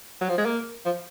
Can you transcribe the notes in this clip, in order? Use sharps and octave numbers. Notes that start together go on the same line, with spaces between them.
F#3
F3
G#3
A#3
F3